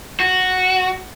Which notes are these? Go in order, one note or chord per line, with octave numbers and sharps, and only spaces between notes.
F#4